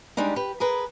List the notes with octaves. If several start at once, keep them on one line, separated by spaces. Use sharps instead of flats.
G3 G#3 D4 D#4
G4 B4
G#4 A#4 B4